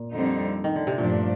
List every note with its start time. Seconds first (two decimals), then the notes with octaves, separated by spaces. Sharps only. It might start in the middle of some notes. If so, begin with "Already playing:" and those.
Already playing: A#2
0.12 F2 D3 G3 C4 D#4
0.64 D#3
0.76 D3
0.87 C3
0.98 G2 A#2 F3 A3 D4